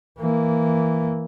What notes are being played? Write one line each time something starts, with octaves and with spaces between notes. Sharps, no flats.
E3 A#3